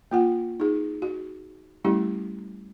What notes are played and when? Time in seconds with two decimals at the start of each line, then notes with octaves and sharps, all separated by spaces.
0.11 A#3 F4 F#5
0.60 D#4 G#4
1.02 F#4
1.85 G3 A3 C#4 E4 G4